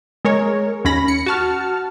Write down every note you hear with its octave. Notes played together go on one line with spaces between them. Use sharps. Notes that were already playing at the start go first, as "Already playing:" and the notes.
G#3 A#4 C#5
D#2 C#4 B5 A#6
C#7
F#4 A5 F6